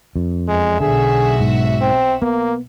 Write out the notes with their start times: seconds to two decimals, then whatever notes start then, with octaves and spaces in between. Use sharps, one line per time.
0.16 F2
0.48 E2 G#3
0.80 B1 D3 F#4 G#4 E5
1.40 G#2
1.81 C4
2.22 A#3 B3